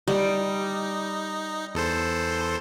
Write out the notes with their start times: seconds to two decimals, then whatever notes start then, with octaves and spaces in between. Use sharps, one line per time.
0.08 G3 D#4
1.75 E2 A4 C5